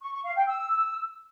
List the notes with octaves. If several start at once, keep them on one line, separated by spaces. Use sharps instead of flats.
C#6
C#6
F5
G5
E6